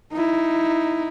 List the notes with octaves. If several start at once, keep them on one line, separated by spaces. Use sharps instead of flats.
D#4 E4